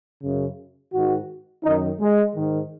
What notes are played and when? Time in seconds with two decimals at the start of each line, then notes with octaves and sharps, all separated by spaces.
0.22 F#2 C#3
0.92 G#2 D#3 F#4
1.64 F#2 D#3 D#4
2.00 G#3
2.35 G#2 D#3